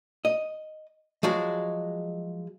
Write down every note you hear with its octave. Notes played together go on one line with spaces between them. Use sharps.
D#5
F3 F#3 G#3 F#4